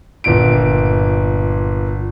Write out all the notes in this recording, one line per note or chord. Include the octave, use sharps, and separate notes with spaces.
G1 A#2 D7